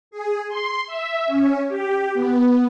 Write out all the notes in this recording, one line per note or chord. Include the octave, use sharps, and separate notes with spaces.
G#4
C6
E5
C#4
G4
B3